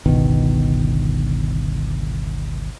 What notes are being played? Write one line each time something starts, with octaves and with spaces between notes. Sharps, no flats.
G1 C#2 B2 D#3